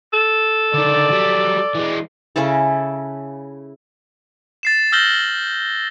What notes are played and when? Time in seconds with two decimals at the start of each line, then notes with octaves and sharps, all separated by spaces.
0.13 A4
0.74 D3 D#3 D5
1.11 F#3 G3
1.75 E3 G#3
2.36 C#3 C#4 E4 A4
4.63 A6 C7 E7
4.92 E6 F6 G6 A#6 F#7 G7